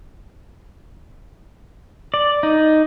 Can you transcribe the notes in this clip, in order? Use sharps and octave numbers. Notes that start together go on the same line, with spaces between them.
D5
D#4